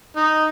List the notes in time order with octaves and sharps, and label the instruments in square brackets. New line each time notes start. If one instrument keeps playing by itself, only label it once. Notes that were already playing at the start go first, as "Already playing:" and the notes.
[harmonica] D#4